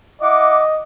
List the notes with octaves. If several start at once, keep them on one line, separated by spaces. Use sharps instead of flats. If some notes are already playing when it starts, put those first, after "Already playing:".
E4 D#5 F#5 D6